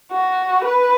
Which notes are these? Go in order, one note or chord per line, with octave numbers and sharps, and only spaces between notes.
F#4
B4